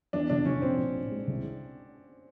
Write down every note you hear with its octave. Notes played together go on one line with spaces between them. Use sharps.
E2 D4
F1 D4
F1 C#4
A#1 C4
A#1
A2
G#3
C2